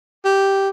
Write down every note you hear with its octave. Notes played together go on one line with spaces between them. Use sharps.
G4